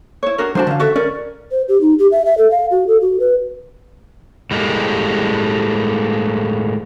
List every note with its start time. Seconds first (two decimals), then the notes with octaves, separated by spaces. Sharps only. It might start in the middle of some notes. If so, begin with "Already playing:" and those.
0.23 E4 C#5
0.38 D4 F#4 A#4
0.55 F#3 D4 F#4 C5 A5
0.67 D3 C#4 F5
0.79 F#4 A4 E5
0.96 C#4 A#4 D5
1.51 C5
1.68 G4
1.81 D#4
1.99 G4
2.12 E5
2.26 E5
2.38 A4
2.51 F5
2.71 F#4
2.87 A4
3.01 F#4
3.20 B4
4.51 A2 G3 G#3 A#3